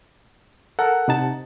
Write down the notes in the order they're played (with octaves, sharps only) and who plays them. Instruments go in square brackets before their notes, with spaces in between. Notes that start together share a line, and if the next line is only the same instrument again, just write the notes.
[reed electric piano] A4 A#4 [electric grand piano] F#5
[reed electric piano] C3 D#4 A5